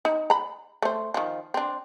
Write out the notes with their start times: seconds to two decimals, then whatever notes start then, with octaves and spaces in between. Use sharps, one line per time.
0.05 D#4
0.30 A#5 B5
0.82 A3 C5
1.14 D#3 F3
1.54 C4 D4